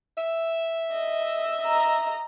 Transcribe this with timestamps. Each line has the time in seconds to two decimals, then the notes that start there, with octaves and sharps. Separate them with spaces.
0.16 E5
0.92 D#5
1.62 D#5 A#5